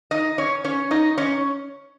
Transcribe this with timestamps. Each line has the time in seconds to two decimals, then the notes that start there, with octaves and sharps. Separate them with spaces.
0.11 D#4 D#5
0.38 C#4 C#5
0.64 C#4 C#5
0.91 D#4 D#5
1.18 C#4 C#5